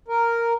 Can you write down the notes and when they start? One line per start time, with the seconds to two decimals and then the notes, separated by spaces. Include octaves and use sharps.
0.08 A#4